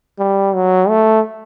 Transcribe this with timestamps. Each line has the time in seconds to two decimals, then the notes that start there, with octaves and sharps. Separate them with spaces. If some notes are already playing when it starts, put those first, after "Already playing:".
0.19 G3
0.55 F#3
0.89 A3